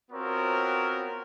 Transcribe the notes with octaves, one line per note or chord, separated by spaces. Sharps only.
B3 C4 F4 F#4 A#4 C#5